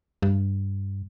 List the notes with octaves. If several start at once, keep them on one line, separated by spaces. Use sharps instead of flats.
G2